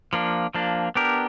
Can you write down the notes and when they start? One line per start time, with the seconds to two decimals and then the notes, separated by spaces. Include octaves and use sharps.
0.13 F3 A#3 D4
0.55 F3 A#3 D4
0.95 B3 D4 G4 A#4